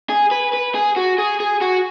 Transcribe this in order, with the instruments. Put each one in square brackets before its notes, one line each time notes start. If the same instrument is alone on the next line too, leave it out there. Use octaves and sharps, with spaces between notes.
[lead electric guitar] G#4
B4
B4
G#4
F#4
G#4
G#4
F#4